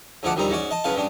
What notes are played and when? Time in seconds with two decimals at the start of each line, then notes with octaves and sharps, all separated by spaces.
0.23 D2 G#2 F3 F#5 A5 D6
0.36 A#1 D#2 D#3 G3 C4 A#5
0.50 G#2 C#4 F#4 D5
0.71 D#5 A5
0.84 B1 C#3 B4 F5 A5
0.95 G2 C#3 G3 D4